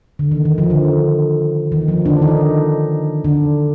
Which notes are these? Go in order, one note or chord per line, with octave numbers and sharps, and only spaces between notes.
D3
D#3
D#3
F3
D3
D#3
F3
D3 D4
D#3 D#4
D3 D4